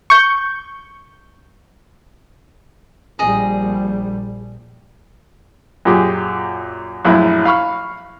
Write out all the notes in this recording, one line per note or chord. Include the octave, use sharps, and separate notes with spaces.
C#6 G6
A#1 G3 G#4 D#5
F#2 A#2 G4 G#4
A#1 F#2 A2 E4
F5 B5 C#6 F6